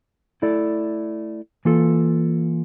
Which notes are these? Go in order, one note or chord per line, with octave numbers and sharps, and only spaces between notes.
A3 E4 A4 D5
E3 A#3 F4 A4